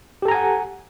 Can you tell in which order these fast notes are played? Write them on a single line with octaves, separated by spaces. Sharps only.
G4 A4 A#5 G#5 F#5